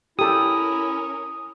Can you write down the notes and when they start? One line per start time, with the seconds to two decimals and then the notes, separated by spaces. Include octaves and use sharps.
0.19 C#4 E4 G4 A4 A#4 D#6